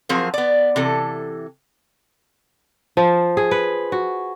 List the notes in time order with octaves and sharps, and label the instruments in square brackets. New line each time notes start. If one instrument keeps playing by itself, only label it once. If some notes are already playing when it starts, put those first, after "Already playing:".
[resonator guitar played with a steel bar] F3 F#3 C4 G#4 A#4
B3 D5
C3 E3 A4
[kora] F3
G#4
B4
F#4